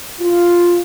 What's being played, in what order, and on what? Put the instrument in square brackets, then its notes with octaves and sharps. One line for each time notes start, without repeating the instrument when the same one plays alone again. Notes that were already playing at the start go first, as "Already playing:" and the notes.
[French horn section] F4